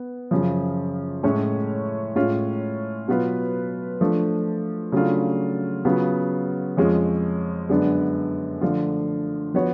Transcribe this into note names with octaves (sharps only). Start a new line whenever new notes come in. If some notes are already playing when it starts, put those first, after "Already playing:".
Already playing: B3
F#2 C#3 F3
A2 G#3 C#4 G#4 C#5
A2 G#3 C#4 F4
B2 F#3 B3 F4 B4
F3 A3 D4
C#3 F#3 A3 D4 F4
C#3 F#3 B3 F4
F2 F3 G#3 C#4 F4
F#2 D3 G#3 B3 D4
D3 F3 A3 F4
F3 B3 F#4 C#5